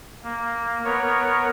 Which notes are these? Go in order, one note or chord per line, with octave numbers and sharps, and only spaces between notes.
A#3
B3 A#4 C#5